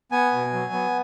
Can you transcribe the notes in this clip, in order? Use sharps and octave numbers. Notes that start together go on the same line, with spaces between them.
B3 G#5
B2
F#3
B3